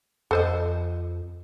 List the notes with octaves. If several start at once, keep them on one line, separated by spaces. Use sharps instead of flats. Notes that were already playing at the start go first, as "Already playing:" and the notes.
F2 A4 C5 D#5